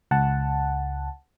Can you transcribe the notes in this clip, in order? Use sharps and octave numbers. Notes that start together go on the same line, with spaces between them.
C#2 F#5 A5